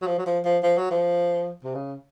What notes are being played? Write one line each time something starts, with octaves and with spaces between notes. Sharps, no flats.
F#3
F3
F#3
F3
F3
F3
F#3
F3
C3
C#3